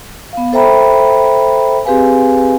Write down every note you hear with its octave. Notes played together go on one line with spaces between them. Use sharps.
B3 F5
A4 C5 E5 G5 A#5 B5
C4 G4 G#4 B4 F5 G#5